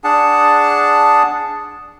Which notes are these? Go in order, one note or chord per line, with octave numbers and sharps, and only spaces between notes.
D4 G#4 F#5 A5